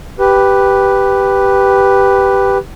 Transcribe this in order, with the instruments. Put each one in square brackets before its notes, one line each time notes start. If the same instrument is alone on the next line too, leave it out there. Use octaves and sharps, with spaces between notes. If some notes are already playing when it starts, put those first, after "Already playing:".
[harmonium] G4 B4